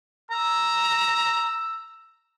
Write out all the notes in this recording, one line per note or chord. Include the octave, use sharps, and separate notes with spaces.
A#5 E6